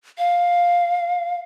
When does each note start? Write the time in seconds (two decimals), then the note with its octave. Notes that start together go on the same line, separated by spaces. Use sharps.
0.18 F5